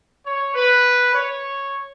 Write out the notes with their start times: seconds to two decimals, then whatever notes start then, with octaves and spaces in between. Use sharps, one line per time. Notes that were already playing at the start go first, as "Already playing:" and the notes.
0.25 C#5
0.55 B4
1.14 C#5